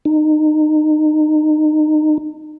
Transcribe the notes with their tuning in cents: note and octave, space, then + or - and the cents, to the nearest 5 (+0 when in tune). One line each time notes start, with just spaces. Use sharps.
D#4 -25